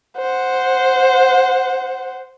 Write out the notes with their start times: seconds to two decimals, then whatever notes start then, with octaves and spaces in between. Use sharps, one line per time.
0.17 C5 F#5